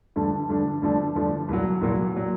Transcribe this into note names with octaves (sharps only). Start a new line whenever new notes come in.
G2 D3 F3 A3 D4
G2 D3 F3 A3 D4
G2 D3 F3 A3 D4
G2 D3 F3 A3 D4
C2 A#2 F#3
C2 A#2 F#3
A#2 F#3